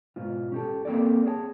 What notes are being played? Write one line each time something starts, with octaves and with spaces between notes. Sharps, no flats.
G#2 B2 F4
C#4 G4 A4
A#3 C4 A4 A#4 D5
G#4 C#5 G5 A5